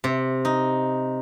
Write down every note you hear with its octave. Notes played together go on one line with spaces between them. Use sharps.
C3
D#4